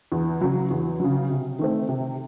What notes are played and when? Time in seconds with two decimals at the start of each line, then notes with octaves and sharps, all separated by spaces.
0.12 E2
0.41 C#3 F#3
0.70 E2
1.00 C#3 F#3
1.30 C3
1.59 D#3 A3 C4
1.89 C3